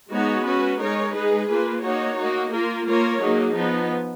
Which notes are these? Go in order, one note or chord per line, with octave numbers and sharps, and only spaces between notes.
G#3 B3 D#4 F#4 C#5
C#4 F#4 B4
G#3 D#4 A#4 C#5
G#3 D#4 G#4 B4
A#3 F4 B4
A#3 D#4 F#4 C#5
A#3 D#4 F#4
A#3 F4 A#4
A#3 F4 A#4 C#5
F#3 A#3 D#4 G#4
F3 B3 D#4